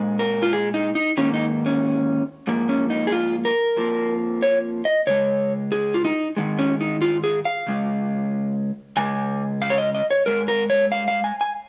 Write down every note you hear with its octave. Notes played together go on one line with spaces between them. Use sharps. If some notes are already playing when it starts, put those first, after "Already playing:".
Already playing: A#2 G#3
A#4
F4
G#4
D#4
D#4
G#2 D#3 A#3 C#4
D#4
C#4
G#2 F3 A#3
C#4
D#4
G#4
F4
A#4
F2 F3 A#3
C#5
D#5
C#3 G#3 C#5
G#4
F4
D#4
G#2 D#3 G#3
C#4
D#4
F4
G#4
F5
C#3 G#3
C#3 G#3 G#5
F5
C#5
D#5
D#5
C#5
G#2 G#3 A#4
A#4
C#5
F5
F5
G#5
G#5